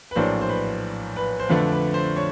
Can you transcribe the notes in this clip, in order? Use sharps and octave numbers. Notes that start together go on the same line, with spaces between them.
B4
A#1 A2 F#3 A#3 D4 C5
C5
B4
B4
C5
F2 D3 F3 A3 D4 B4
B4
C5
C#5